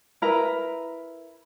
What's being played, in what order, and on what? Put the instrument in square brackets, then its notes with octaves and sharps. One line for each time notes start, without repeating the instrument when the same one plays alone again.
[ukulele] E4 A#4 B4 A#5